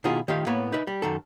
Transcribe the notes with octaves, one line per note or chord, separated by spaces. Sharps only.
B2 D#3 E4 F4 G#4
D#3 A3 F4 G4 F5
A2 A#3 B3 C#5 B5
D#4 B4 E5
G3
F#2 D#3 A4